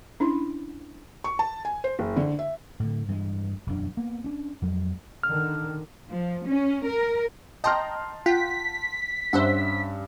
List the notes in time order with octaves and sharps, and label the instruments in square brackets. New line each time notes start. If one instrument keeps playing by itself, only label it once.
[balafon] C#4 D4 E4 B5 C6
[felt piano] C#6
A5
G#5
C5
F#1
D3
E5
[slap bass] A2 D3
G2 E3 F3 G#3
E1 F#2 D4
A#3 B3
C#4 D4
F2 F#3 G#3
[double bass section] D3 D#3 [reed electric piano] F6
[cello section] F3
C#4
A#4
[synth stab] D#5 G5 A#5 [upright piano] A5 C6 F6
[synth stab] F4 F#5 G5 [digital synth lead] B6
[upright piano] G2 C#4 E6 [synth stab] C5 E5 F#5